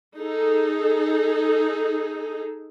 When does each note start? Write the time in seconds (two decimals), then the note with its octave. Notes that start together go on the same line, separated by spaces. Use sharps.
0.18 D#4 G#4 A4